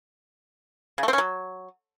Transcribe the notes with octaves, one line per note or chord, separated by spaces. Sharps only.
C#3
A3
C4
C#4
F#3